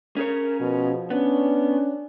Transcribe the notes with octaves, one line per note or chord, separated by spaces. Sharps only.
C#4 G#4 A#4 C#5
B2 F3
B3 C#4 D4